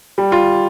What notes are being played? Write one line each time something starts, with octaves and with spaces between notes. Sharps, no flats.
G3
F4